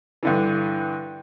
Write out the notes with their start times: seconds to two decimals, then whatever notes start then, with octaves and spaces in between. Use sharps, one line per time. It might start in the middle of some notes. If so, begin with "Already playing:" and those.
0.23 G2 D3 E3